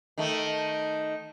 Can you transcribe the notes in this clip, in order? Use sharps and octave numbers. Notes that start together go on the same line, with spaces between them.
D#3 A3